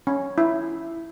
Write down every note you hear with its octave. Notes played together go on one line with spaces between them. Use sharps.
C#4
E4